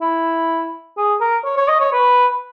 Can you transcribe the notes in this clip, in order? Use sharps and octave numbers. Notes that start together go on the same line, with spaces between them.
E4
G#4
A#4
C#5
C#5
D#5
C#5
B4